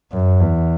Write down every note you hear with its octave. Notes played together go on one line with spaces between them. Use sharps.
F#2
E2